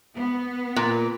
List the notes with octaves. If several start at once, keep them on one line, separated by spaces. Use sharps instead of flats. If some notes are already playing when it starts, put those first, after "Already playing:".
B3
A#2